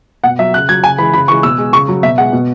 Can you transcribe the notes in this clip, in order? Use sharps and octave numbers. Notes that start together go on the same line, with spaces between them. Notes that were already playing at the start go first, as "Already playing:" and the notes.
B2 F#5
F#3 E5
C#3 F#6
F#3 G#6
C#3 G#5
E3 G#3 B5
C#3 B5
E3 G#3 C#6
B2 E6
G#3
C#3 C#6
F#3
B2 E5
G#3 F#5
B2